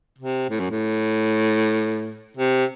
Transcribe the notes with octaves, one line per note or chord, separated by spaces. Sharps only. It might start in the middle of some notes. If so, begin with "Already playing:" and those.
C3
A2
F#2
A2
C3